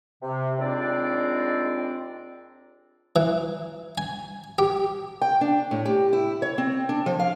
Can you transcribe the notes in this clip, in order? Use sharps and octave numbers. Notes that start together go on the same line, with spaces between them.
C3
D#2 G#3 C4 D4 F4 D5
E3
G#5
G4
G5
D4
A2
G4
E4
C#5
C4
D4
F3
F5